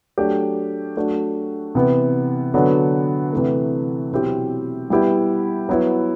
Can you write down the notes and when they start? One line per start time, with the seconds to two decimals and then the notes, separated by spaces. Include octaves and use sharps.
0.18 F#3 A3 D4 G4
0.96 F#3 A3 D4 F#4
1.75 C3 E3 B3
2.54 D3 F#3 B3 D4
3.33 C3 E3 A3
4.12 B2 F#3 C4 E4 G4
4.90 G3 B3 E4 G4
5.69 F#3 B3 E4